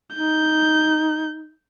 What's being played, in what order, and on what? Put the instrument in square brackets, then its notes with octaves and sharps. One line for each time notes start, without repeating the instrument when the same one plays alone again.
[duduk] D#4 [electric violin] G6